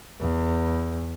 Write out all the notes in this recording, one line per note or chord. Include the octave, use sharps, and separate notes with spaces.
E2